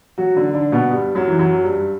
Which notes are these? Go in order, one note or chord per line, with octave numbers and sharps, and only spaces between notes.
F#3 F#4
D3 D4
D3 D4
B2 B3
G2 G3
F#2 F#3
E3
F#2 F#3
G2 G3